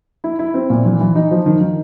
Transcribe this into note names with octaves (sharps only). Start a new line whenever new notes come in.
E4
E4
C4
A#2
E3
E3
D#4
F3
D#3
D#3